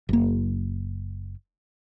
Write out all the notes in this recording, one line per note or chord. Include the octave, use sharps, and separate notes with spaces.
F#1 A#3